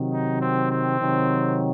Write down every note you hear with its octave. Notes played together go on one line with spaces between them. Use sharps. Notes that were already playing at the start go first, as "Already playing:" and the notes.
Already playing: C3 D#3 F#3
D#4
C4
C4
C3 D#3 F#3